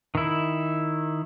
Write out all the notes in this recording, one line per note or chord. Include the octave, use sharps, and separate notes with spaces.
D#3 E4